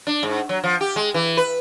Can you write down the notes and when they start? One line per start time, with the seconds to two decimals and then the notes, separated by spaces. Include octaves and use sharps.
0.07 D4
0.23 G#2
0.49 F#3
0.64 F3
0.81 G4
0.96 G#3
1.14 E3
1.37 B4